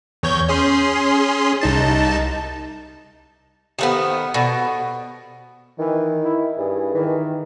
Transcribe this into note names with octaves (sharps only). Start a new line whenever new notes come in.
E2 C#5 G6
C#4 G#4 C6
C2 D#4 A5
D#3 A3 B3 G4 A4 C5
B2 A4 D5 F#5
D#3 E3
E4
G2 G#4
D#3 E3